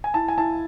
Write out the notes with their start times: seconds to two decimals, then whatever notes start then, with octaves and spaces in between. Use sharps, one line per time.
0.04 G#5
0.14 E4 A5
0.28 G#5
0.38 E4 A5